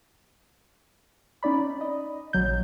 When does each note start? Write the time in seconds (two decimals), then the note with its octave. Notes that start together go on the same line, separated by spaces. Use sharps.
1.43 C#4 D#4 D5 B5
1.81 D#5
2.33 A#1 F#3 G6